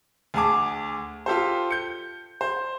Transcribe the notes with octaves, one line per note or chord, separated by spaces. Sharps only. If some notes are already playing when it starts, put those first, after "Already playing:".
D2 G#4 G#5 A5 D6
F4 G4 A4 C5
G6 C#7
C5